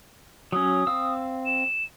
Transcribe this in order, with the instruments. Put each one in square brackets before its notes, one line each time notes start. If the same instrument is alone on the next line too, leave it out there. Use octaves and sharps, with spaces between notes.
[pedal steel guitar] F#3 C#4 [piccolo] D#6
[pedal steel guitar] C4 F5 E6
[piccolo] E7